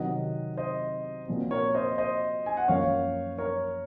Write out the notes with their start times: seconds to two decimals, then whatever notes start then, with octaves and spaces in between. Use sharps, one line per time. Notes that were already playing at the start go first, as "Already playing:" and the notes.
Already playing: C3 D#3 F#3 C4 D#5 F#5
0.57 C5 D#5
1.28 A#2 F3 C4 F#4
1.51 A#4 C#5
1.75 C5 D#5
1.98 C5 D#5
2.46 G#5
2.57 F#5
2.68 F#2 F3 A#3 C#5 F5
3.38 A#4 C#5